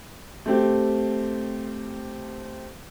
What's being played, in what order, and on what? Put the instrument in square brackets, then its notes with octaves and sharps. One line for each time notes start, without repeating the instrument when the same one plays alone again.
[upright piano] A3 C4 G4